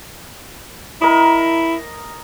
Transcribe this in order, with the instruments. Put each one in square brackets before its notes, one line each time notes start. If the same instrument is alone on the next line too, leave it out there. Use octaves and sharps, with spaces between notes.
[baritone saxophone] E4 [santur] A#4 D#5